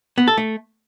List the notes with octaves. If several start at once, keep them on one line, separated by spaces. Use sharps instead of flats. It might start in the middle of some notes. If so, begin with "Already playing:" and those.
B3
A4
A3